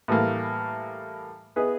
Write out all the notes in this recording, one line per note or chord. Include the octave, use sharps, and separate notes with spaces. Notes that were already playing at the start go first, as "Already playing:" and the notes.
A2 E3 G3 A#3
B3 E4 G#4 B4 D#5